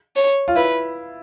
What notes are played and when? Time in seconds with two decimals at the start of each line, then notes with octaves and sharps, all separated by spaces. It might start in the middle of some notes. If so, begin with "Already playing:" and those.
0.16 C#5
0.48 F4
0.55 E4 B4